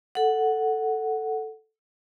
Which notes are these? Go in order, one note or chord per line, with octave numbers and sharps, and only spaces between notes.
A4 F#5